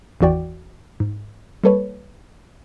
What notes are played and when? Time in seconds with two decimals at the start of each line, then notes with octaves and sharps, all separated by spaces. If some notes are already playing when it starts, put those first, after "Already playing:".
0.21 G#1 E2 E3 F#4 D5 G5
1.00 G#2
1.64 G3 A#3 A4 B4 C#5